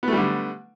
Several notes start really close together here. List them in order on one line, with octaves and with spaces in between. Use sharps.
B3 A3 G3 D3